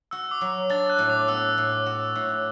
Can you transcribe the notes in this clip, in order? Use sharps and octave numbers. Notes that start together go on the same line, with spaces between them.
F#4 E6
D6
F#3
D4 A6
F#6
A2
D6
B3 E6
A2
F#4
A2